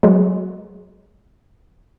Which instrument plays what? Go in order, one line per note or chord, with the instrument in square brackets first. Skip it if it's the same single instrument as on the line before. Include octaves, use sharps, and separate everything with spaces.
[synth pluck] F#3 G#3